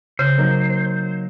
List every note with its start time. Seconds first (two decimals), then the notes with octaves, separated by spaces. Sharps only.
0.19 C#3 C5
0.37 F#3 A#3 D#4